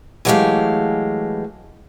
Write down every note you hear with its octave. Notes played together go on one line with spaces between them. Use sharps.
E3 F#3 G#3 A3 G4 F5